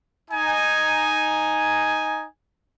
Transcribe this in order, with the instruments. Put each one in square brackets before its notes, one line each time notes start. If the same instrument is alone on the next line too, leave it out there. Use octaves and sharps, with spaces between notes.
[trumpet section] D#4 G#5